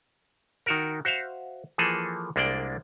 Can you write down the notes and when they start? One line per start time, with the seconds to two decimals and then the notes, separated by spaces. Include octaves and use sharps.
0.66 D#3 F#4 A#4
1.05 F#4 C5 E5 F5
1.78 E3 F3 A#3 G#4 A4
2.36 C2 G#3 A#3 D4 D5 G5